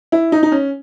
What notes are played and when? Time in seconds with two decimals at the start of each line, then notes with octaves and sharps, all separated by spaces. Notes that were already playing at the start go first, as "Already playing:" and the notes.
0.12 E4
0.32 D#4
0.43 D#4
0.52 C#4